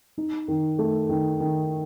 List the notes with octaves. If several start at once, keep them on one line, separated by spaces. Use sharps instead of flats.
D#4
D#3
A3
D#3
D#3